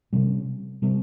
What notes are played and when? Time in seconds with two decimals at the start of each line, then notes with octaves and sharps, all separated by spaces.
0.13 C3 G3 C#4
0.82 C3 G3 C4